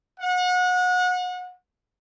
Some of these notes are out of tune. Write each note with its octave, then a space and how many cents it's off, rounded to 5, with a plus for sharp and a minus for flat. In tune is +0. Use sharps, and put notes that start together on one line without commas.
F#5 -30